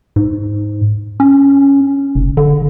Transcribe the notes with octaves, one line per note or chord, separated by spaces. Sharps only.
G#2
C#4
F#1
D3